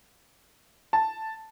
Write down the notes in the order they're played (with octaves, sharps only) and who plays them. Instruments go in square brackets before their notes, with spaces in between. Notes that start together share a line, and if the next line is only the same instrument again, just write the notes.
[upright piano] A5